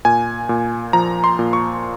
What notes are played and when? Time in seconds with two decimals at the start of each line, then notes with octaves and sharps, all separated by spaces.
0.05 A#2 G#5
0.49 A#2
0.93 F3 A#5
1.24 C6
1.39 A#2
1.53 C#6